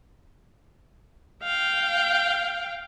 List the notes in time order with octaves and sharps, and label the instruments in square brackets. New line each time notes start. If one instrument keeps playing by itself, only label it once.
[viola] F5 G5